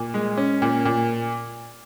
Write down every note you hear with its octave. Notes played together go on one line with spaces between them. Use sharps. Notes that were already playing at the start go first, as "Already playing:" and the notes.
Already playing: A#2
G#3
C#4
A#2
A#2